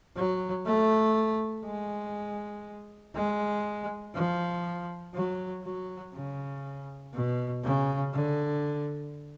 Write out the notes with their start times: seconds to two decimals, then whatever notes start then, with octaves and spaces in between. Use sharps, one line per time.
0.16 F#3
0.66 A3
1.65 G#3
3.15 G#3
4.15 F3
5.14 F#3
5.64 F#3
6.14 C#3
7.14 B2
7.63 C#3
8.13 D3